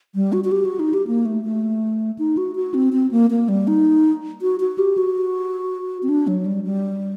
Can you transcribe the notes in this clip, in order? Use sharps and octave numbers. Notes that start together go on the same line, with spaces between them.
G3
F#4
F#4
G4
F#4
D#4
G4
A#3
A3
A3
D#4
F#4
F#4
C4
C4
A#3
A#3
G3
D#4
F#4
F#4
G4
F#4
C4
D4
F#3
G3
G3